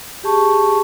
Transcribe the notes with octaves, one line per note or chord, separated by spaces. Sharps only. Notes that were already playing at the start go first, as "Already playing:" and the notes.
G4 G#4 A5 C#6